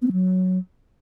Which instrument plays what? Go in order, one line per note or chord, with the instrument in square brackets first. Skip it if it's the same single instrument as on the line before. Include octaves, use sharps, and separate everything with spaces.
[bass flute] B3
C4
F#3